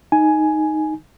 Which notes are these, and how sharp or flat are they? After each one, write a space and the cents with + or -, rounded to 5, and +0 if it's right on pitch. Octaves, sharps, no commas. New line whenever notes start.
D#4 +0 G#5 +10